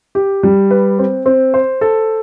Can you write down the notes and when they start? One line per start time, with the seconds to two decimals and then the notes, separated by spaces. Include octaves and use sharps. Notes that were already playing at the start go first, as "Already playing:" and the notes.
0.15 G4
0.43 G3
0.71 B4
0.99 C4
1.26 C4
1.54 C5
1.81 A4